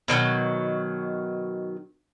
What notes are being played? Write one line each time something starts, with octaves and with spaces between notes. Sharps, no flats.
B2 D#3 F3 F#3